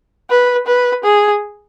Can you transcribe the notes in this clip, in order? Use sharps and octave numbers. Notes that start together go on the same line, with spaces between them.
B4
B4
G#4